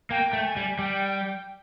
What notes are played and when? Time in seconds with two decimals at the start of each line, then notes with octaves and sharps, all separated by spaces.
0.10 A#3 G5
0.33 A3
0.44 G#5
0.57 G3
0.79 G3 G5